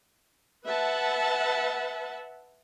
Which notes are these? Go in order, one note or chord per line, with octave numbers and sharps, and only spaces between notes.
B4 E5 F#5 A5